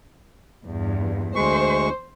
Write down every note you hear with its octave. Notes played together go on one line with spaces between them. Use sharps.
E2 G2
D2 G#3 C5 C#6